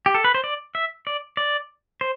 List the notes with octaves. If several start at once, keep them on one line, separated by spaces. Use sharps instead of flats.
G4
A4
B4
C5
D5
E5
D5
D5
C5